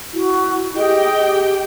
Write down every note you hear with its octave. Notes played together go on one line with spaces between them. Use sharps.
E4 F#4
G4 G#4 D#5 G5